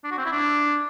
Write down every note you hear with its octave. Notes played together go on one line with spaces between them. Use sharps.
D4
F#4
C4
E4
D4